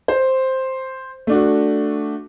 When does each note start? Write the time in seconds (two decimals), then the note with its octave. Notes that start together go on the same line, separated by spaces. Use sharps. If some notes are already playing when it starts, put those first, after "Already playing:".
0.08 C5
1.27 A3 D4 F#4